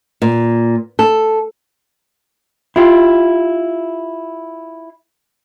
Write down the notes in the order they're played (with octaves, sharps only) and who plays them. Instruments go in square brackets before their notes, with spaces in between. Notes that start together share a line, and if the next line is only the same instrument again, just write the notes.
[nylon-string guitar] A#2
A4
[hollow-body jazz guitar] E4 F4 G4